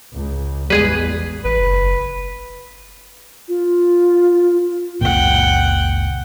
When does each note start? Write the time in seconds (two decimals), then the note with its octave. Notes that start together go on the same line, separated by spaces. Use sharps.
0.13 C#2
0.70 A1 E2 G3 G#3 G#4 B4
1.45 A1 B4
1.60 F#1
3.49 F4
5.01 F#1 C#2 A#2 F#5 G5